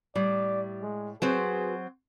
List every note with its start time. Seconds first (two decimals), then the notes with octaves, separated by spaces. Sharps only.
0.15 A2 G3 D5
0.83 G#3
1.22 F#3 C4 F#4 G#4 B4 C5